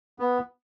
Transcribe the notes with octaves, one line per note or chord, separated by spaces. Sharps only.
B3